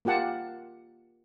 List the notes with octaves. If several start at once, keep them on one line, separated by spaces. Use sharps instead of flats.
A#3 F4 G4 F#5 A5